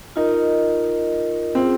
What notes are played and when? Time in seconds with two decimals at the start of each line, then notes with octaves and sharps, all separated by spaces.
0.16 D#4 F4 A#4 D#5
1.55 C4 C#4 F4 G#4